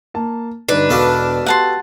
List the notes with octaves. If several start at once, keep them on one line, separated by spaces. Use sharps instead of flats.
A#3 A5
G2 D3 D4 D#4 B4
E1 B2 A4 F5 D6
G4 F#5 A5 C6